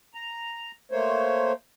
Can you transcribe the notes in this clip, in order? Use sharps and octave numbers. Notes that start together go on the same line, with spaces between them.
A#5
A3 A#3 C5 C#5